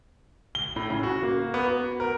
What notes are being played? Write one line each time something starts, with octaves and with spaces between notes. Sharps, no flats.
G7
A2
C#3
F#4
A#3
B3
F#4
A#4